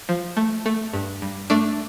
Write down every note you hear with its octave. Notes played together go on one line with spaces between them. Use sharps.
F3
A3
A3
G2
G2
A3 D4